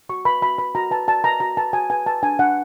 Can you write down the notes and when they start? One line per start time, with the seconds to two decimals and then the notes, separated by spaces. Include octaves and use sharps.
0.09 F#4 C#6
0.25 B4 B5
0.42 F#4 B5
0.58 B4 B5
0.75 F#4 A#5
0.91 B4 A5
1.08 F#4 A5
1.24 B4 A#5
1.40 F#4 A#5
1.57 B4 A5
1.73 F#4 G#5
1.90 B4 G#5
2.06 B4 A5
2.23 D4 G#5
2.39 D4 F#5